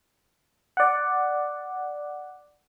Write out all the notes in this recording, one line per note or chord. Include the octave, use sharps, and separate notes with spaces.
D5 F#5